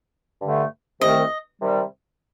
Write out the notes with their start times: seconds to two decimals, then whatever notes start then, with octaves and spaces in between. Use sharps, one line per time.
0.41 G2 D3 A3
1.01 C2 C3 D#3 A3 C4 D#5
1.61 C3 D#3 G3